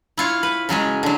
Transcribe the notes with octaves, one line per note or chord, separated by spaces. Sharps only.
E4 F4 C#5
B4
C#3 F#3 G#3 C#4
D3 F#3